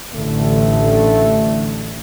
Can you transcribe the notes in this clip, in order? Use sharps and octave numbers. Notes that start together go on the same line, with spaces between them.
A1 A2 D3 A3